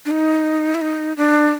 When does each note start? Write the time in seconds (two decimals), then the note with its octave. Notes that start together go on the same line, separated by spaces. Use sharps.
0.06 D4
0.11 D#4
0.75 E4
0.81 D#4
1.17 D4